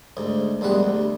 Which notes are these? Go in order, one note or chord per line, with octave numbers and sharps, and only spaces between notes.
D2 G#2
A#1 E2 G3 G#3 F#5
D2